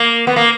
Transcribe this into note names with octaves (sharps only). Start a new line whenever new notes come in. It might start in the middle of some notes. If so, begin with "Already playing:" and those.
Already playing: A#3
B3
A#3